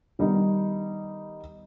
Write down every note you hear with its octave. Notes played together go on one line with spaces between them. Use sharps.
D#3 G3 B3 D#4